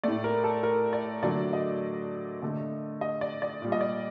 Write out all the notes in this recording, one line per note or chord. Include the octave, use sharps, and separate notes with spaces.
A2 A3 D5
A#4
A4
A#4
D5
D3 F#3 A3 D5
D#5
D3 A3
D#5
D5
D5
A#2 G3
D#5
D5